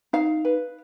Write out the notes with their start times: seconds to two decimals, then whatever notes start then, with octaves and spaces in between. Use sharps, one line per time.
0.13 D#4 F5
0.45 B4